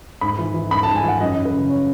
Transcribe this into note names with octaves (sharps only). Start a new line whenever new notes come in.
G#2 B5
E3
E3
G#2 B5
A5
G#2
G#5
E3 F#5
F#2 D#5
E3
B4
C#3
C#5